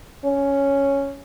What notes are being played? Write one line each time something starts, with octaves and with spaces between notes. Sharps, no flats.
C#4